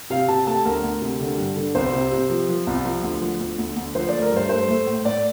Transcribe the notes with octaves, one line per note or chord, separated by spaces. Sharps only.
C3 F5
C3 A5
A3 A5
D2 A#4
D2
C3
D3
G2
D3
C2 C5
C3
C3
F3
F3
C2
F3
D2
F3
D2
D2
D2
F3 C5
A3 D5
A#4
G2 C5
A3 C5
A3
A2
A2 D5